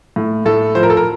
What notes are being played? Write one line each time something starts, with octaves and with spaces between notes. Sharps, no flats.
A2
A2 A4
F3 C5
A#4
A4
A#4